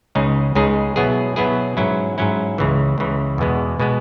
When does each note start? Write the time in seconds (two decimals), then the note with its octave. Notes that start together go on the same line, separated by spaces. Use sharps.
0.15 C#2 C#3 G#3 D#4 G#4
0.55 C#2 C#3 G#3 D#4 G#4
0.96 B2 F#3 B3 E4 G#4
1.36 B2 F#3 B3 E4 G#4
1.77 G#2 F#3 C#4 E4
2.18 G#2 F#3 C#4 E4
2.58 C#2 C#3 E3
2.98 C#2 C#3 E3
3.38 E2 B2 G#3 B3
3.80 B2 G#3 B3